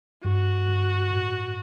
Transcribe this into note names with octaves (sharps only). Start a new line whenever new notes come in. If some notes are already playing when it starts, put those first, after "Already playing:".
G2 F#4
G2
A2